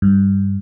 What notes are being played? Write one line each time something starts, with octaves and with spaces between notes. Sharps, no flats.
G2